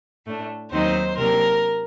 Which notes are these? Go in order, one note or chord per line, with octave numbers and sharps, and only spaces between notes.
A2 A3 D4
D#2 D#3 F#3 C4 D#4 C5
C3 F#3 A#3 D4 A#4